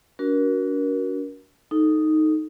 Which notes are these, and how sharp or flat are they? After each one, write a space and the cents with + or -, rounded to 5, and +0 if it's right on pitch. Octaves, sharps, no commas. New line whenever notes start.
D4 -45 F#4 +0 A#4 +25
D#4 +0 A4 -10